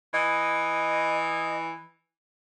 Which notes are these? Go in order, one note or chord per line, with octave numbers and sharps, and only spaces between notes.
E3 D#5